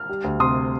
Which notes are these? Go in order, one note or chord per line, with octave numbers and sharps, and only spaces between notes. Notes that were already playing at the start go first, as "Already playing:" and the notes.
Already playing: F6
G3
D2
C3 C6 D#6